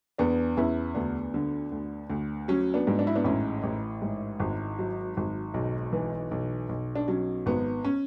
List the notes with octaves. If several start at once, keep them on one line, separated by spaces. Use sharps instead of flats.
E2 B3 D4
E2 C#4 E4
D2 B3 D4
D3
D2
D2
F#3 C#4
B3 D4
G#2
D4
E4
B3 D4
A1 C#4 E4
A1
G#2
G#1
F#3
G#1
B1
E3
B1
B1
D4
F#3 C#4
G#1 B3
C#4